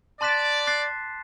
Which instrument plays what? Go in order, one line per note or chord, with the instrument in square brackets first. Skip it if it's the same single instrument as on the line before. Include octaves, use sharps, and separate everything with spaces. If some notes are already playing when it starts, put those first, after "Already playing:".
[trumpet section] D5 [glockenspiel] A5 C6 F#6 B6 E7
[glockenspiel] D6 F#6 A6 C7